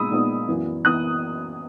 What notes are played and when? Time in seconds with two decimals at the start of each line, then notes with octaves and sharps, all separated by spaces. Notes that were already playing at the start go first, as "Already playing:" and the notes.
Already playing: A#2 G#3 B3 D#4 B5 D#6 E6
0.11 A#2 G#3 B3 D#4
0.48 F#2 E3 B3
0.85 E3 B3 D#6 F#6